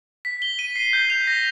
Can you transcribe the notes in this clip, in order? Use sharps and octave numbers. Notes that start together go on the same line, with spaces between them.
B6
G7
D#7
C7
G6
F7
A#6